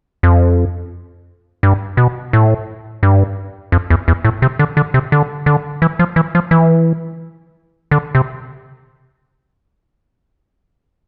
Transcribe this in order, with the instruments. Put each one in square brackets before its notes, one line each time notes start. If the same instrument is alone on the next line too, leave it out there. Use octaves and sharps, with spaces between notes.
[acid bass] F2
G2
B2
A2
G2
F2
E2
E2
A2
C3
D3
D3
C3
D3
D3
E3
F3
E3
F3
E3
D3
C3